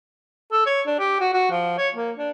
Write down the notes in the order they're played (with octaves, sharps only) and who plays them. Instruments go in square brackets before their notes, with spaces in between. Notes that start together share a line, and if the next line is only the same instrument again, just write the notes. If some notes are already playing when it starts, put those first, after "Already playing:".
[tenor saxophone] A4
C#5
D4
G4
F#4
F#4
F3
C#5
A#3
D4